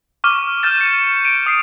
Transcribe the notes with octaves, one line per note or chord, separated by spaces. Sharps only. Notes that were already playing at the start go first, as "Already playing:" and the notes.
C#6 D6 F6 D#7
F6 G6 A6 E7
C#7
D7 D#7
D#6 C7 D7